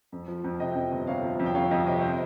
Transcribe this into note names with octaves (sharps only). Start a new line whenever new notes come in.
F2
F3
F2
C3 D#5 G5
F2
G1
C3 C#5 F5
F3
F2
G5
F2 C#5 F5
F2 D#5 G5
C3 D#5 G5
C#5
C5 D#5